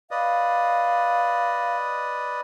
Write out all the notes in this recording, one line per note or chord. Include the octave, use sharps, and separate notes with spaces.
B4 D5 D#5 F5